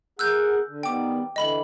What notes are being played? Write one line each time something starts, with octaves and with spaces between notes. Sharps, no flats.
G#4 A#4 F#5 E6 F#6 G6
D3
D#3 G3 B3 G5 D6
D3 E3 D#5 B5 F#7